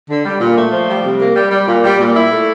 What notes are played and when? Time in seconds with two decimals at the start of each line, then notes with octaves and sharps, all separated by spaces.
0.10 D3
0.25 G3
0.41 A#2
0.57 A3
0.72 F3
0.89 G3
1.05 C3
1.20 A#3
1.36 G3
1.52 G3
1.68 A#2
1.84 G3
2.00 A#2
2.16 E4
2.30 A3